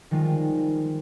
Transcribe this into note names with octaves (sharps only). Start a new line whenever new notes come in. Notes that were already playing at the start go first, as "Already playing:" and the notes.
D#3 F3 G3 G#3 D#4 F4